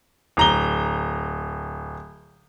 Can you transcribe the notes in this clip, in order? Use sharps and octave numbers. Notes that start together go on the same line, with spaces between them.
D1 A#5 G7